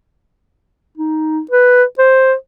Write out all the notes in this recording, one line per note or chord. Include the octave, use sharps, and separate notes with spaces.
D#4
B4
C5